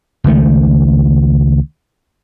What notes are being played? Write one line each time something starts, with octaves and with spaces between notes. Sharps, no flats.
C#2 D#3 A3